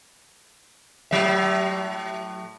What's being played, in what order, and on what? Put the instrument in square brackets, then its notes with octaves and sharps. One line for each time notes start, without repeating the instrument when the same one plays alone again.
[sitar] A2 F#3 E5